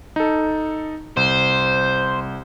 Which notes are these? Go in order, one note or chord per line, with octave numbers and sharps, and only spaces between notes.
D#4 A4
C2 C5